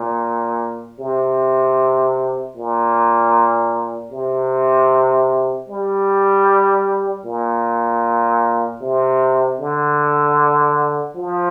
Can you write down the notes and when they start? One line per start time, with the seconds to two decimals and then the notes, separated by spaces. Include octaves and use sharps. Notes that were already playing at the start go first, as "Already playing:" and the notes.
Already playing: A#2
1.00 C3
2.56 A#2
4.12 C3
5.69 G3
7.26 A#2
8.81 C3
9.60 D3
11.16 F3